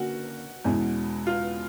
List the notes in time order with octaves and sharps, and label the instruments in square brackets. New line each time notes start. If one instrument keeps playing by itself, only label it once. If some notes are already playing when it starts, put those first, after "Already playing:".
Already playing: [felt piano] D3 A#3 C#4 [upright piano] F#4
[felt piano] E2 B2 G#3 C#4 E4
[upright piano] F4